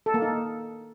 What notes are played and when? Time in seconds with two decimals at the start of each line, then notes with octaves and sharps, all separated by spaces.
0.06 A4
0.14 A#3
0.22 D#4